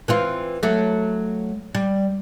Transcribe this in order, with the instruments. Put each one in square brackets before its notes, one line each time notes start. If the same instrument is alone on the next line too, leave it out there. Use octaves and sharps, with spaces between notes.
[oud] E3 C4 F4
F#3 A3
G3